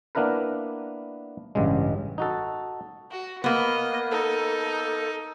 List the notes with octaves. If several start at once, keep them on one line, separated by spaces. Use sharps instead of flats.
A#3 B3 D4 E4 A#4 B4
A1 G2 C#3 G#3
D#4 F#4 A4
F#4
A#3 B3 D#5
D#4 A4